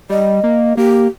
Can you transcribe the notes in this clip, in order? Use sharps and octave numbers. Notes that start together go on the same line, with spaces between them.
G3 D#5
A#3
A#3 G4